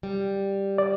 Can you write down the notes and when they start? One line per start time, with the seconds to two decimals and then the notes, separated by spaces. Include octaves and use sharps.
0.03 G3
0.78 D5